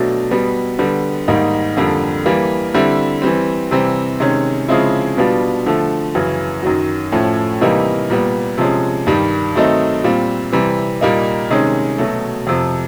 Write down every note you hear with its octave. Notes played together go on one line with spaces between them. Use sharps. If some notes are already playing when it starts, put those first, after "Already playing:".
Already playing: B2 F#3 A3 D4
B2 G3 B3
D3 G3 B3
G#2 D#3 G3 A#3 D#4
F2 D3 G3 A#3
E3 G3 A#3
D3 G3 C4 E4
E3 G3 C4
C3 E3 G3 C4
C3 D#3 G#3 C#4
C#3 F3 G#3 C4 E4
B2 G3 B3 D4 F4
D3 F3 A3
F#2 C#3 E3
F#2 D#3 F#3
A2 F3 A3 C#4
C3 E3 G3 A#3 D#4
A#2 G3 B3
C3 F3 G#3 C#4
G2 D#3 G3
D#3 F#3 A3 C4 D#4
A#2 G3 C4 F4
C3 E3 G3 C4
A#2 G3 A#3 D#4
C3 D#3 G#3 C#4
B2 F#3 A3
F2 C3 F3